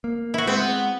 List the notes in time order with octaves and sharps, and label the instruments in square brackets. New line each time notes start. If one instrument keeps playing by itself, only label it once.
[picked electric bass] A#3
[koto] E4 F#4
[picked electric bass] G#3 [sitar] B3 [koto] C4